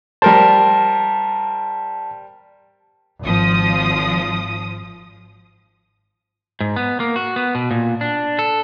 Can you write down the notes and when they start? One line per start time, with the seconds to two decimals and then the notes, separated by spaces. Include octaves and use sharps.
0.22 G3 A#4 C5 A5
3.21 G#1 F3 D#6
6.60 G#2
6.76 B3
7.00 A#3
7.16 F#4
7.36 B3
7.55 B2
7.71 A#2
8.01 D4
8.39 A4